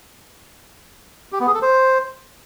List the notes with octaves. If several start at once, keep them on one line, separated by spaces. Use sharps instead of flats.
G4
B3
G#4
A4
C5